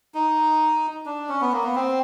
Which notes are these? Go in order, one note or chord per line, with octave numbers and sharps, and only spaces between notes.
D#4
D4
C#4
B3
A#3
B3
C4